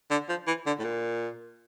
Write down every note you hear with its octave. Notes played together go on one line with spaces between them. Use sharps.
D3
F3
E3
D3
A2
A#2